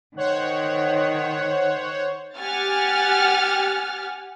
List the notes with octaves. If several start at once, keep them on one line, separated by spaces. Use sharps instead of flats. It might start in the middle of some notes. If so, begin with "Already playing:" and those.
D#3 C5 C#5 F#5
G4 F#5 G#5 F6 A6